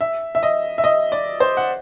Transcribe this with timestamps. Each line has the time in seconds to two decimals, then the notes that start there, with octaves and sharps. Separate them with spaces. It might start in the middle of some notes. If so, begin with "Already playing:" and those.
0.01 E5
0.35 E5
0.43 D#5
0.78 E5
0.84 D#5
1.12 D5
1.40 C5
1.57 F#5